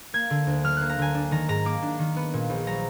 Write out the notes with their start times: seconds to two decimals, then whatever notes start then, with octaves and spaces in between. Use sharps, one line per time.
0.14 A#3 G#6
0.30 D3
0.47 D2
0.64 F#3 F6
0.77 A#3 F#6
0.89 A#5
0.98 D3 G#5
1.15 D4
1.31 D#3 A#5
1.48 G#2 A#5
1.65 A#3 D6
1.82 D4
1.99 D#3
2.16 B3
2.34 A#2
2.50 A#1
2.67 F#3 A#5